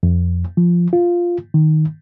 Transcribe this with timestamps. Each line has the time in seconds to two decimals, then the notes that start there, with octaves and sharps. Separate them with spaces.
0.03 F2
0.57 F3
0.93 F4
1.54 D#3